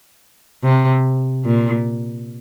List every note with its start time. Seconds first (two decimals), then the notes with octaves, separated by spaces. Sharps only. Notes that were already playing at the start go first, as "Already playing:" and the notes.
0.63 C3
1.45 A#2